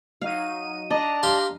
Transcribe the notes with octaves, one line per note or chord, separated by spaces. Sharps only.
F#3 D#4 F5 D#7
D4 D5 D#5 A5 A#5
G4 F5 C6